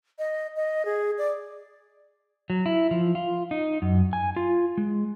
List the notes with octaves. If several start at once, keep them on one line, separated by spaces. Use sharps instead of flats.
D#5
D#5
G#4
D5
F#3
E4
F3
F4
D#4
F#2
G#5
F4
G#3